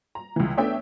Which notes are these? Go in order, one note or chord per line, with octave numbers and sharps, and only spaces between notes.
A#5
C#2 E3
A3 B3 C#4 D4 E5 G5